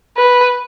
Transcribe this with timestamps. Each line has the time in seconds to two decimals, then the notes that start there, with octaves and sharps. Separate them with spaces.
0.17 B4